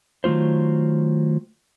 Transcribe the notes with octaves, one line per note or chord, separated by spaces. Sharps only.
D#3 F#3 A3 F4 C5